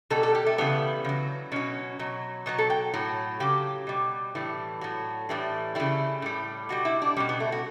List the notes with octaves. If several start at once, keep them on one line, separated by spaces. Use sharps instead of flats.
B2 G3 A4
A4
G4
A3
C#3 E3 G3 B3
C#3 F#3
B2 F#3 C#4
B2 F#3
B2 F#3 B3
A4
G5
A2 F#3
C#3 F#3 G4
B2 G3
A2 E3 G3
A2 F#3
A2 E3 G3
C#3 G3 E4
A2 G3
B2 G3 F#4
E4
D4
B2 G3 C#4
B3
A3
F#4